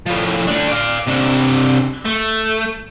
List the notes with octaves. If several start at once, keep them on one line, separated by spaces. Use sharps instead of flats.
A2 F3
A3 D4
D5 F5
C3 D4
A3